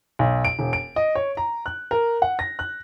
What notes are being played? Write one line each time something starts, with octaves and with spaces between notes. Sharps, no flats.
B1
D7
E1
D7
D#5
C#5
A#5
F#6
A#4
F#5
A#6
F#6